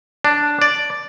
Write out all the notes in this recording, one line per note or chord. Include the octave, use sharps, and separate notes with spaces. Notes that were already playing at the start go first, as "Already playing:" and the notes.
D4
D5